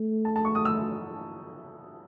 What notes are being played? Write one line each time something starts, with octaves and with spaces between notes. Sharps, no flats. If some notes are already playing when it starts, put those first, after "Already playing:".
Already playing: A3
A5
A5
C#6
D#6
E6